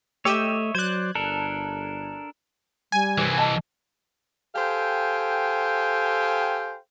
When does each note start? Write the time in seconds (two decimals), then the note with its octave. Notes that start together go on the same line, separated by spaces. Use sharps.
0.25 A3 G4 C#5 D#5 E5 E6
0.75 F#3 C5 D5 F#6 G#6
1.15 G1 D4 A4 A#4
2.92 G3 G#5
3.18 C2 E3 D#4 B4 C5
3.38 D#5 A5
4.55 G4 A4 C5 F5 G5 G#5